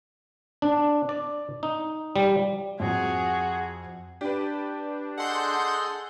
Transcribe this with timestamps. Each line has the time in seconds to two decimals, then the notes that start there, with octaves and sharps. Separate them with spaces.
0.62 D4
1.09 D5
1.63 D#4
2.16 G3
2.80 F2 F#4 G#4
4.21 D4 G4 B4
5.17 G#4 A4 D#5 F#5 C6 G6